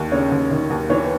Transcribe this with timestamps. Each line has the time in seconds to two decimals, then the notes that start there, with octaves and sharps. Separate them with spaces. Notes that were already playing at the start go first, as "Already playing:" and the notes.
Already playing: D#2
0.12 C#3 C#5
0.32 D#2
0.51 D#3
0.70 D#2
0.90 E3 C#5